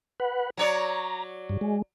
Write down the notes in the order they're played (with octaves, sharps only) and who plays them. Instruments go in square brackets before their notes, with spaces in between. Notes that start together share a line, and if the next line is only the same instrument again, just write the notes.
[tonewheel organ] B4 F#5
[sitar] F#3 C#5 D5 [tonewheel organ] A#5
[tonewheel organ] G2
G#3